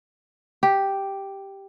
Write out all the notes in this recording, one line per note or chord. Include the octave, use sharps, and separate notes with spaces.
G4